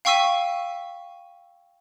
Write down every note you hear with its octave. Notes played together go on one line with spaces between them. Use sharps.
F5 G5 C#6 E6 B6 D#7